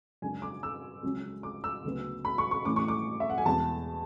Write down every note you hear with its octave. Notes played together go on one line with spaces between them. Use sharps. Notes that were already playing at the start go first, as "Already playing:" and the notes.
F#2 C#3 G#3 D4 G#5
D6
E6
C#2 C#3 F#3 C#4
D6
E6
D2 C#3 F#3 B3
B5
C#6
C#6
A2 E3 A3 C#4 D6
C#6
D6
E5
F#5
G#5
E2 B2 G#3 A5